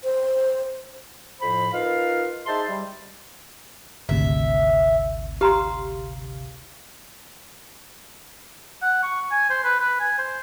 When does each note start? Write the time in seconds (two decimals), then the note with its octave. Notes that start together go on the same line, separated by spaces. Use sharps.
0.04 C5
1.41 F2 A2 F3 C5 B5
1.73 D#4 F4 A#4 B4 F5
2.46 D#4 G#4 C5 E5 A5 C6
2.68 G3
4.09 G#1 D2 C3 E5
5.41 G4 F5 A#5 C6
8.82 F#5
9.03 C#6
9.31 G#5
9.50 C5
9.64 B4
9.80 B4
10.00 G#5
10.18 C5